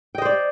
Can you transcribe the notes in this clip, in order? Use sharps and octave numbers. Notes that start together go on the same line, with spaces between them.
C5 D5 D#5 G5